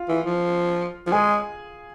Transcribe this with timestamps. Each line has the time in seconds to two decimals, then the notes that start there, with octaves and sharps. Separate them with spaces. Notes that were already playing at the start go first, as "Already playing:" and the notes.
Already playing: F4 F5
0.09 E3
0.26 F3
1.07 F3
1.12 G#3 G#4 G#5